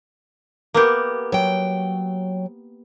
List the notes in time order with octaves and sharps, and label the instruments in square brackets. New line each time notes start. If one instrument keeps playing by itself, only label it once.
[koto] A#3 B3 G4
[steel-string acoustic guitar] F#3 G5